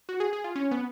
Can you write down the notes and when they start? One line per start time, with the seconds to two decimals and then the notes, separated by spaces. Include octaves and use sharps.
0.09 F#4
0.20 G#4
0.33 G#4
0.44 F4
0.56 C#4
0.71 B3